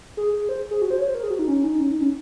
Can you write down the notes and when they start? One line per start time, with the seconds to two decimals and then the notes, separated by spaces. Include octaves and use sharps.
0.17 G#4
0.33 G#4
0.49 C5
0.71 G#4
0.82 F#4
0.90 C5
0.99 C#5
1.07 C5
1.15 A#4
1.23 G#4
1.31 F#4
1.39 D#4
1.48 C#4
1.64 D#4
1.80 C#4
1.91 D#4
2.01 C#4